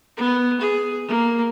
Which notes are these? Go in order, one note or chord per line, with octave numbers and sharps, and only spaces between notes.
B3
G#4
A#3